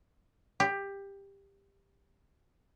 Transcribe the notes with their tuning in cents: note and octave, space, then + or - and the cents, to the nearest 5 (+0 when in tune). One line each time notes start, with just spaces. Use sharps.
G4 +15